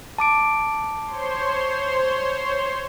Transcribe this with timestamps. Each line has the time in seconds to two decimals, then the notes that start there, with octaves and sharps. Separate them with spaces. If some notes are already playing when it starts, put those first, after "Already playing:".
0.18 A5 D6 D7
1.05 C5 C#5 C6